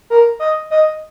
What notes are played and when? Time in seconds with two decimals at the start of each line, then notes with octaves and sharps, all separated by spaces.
0.10 A#4
0.39 D#5
0.71 D#5